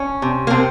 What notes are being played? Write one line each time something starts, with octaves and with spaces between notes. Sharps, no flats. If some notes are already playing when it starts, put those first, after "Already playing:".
Already playing: C#4
C3
A#3
C3 C4